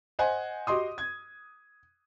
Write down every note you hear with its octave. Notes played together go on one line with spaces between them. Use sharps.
C5 D#5 F#5 G#5
F#4 G4 D#5 C6 D#6
G#6